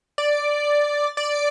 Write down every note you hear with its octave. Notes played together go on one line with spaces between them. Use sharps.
D5
D5